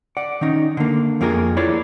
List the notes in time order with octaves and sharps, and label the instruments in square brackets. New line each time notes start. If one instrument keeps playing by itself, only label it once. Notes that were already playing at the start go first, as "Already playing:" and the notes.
[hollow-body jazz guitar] D5 F#5
D#3 C#4 D#4
D3 A#3
F2 A#3 F4 G#4 A#4
E4 G#4 C#5 D5